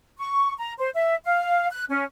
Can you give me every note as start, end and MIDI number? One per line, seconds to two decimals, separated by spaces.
0.18 0.53 85
0.58 0.73 82
0.78 0.89 72
0.94 1.15 76
1.24 1.67 77
1.71 1.84 90
1.89 2.04 61